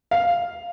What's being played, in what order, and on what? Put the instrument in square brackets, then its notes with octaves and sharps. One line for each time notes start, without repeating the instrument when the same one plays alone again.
[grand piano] F5